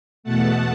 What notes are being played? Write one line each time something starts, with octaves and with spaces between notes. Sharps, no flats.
E2 B2 A3 F#5 A5